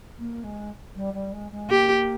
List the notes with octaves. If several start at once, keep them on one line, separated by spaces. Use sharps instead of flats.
A#3
G#3
G3
G3
G#3
G#3
A#3 G4